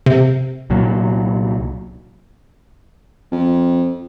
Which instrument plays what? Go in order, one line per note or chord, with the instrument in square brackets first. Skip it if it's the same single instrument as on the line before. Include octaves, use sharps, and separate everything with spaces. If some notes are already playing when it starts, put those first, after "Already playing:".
[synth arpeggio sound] C3
[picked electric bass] C2 A#2 F#3
[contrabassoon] F2